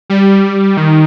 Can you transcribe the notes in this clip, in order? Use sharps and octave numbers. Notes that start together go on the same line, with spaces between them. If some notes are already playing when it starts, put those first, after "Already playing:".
G3
D#3